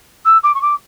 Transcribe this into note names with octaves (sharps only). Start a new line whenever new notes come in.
E6
D6
C#6
D6